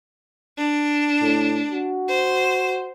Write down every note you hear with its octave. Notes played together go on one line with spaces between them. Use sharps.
D4
A2
F#4
C5